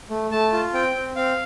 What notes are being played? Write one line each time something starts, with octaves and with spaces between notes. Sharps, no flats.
A3
A3 A5
F4
C4 G5
C4
C4 F5